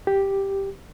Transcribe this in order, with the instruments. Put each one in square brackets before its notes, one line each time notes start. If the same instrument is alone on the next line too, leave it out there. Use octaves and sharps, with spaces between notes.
[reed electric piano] G4